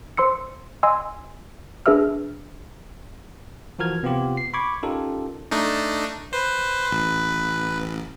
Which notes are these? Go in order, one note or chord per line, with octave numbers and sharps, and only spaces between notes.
C5 C6 E6 C#7
D#5 G#5 C6 E6
D4 G#4 B4 E5 E6 F6
E3 F3 F#4 A#4 F6 G#6
C3 B3 C4 F4 G4
C7
B5 C#6 D6 G#6
C#4 D#4 F4 G4 A4 A#4
A3 D4 D#4
B4 C5
A1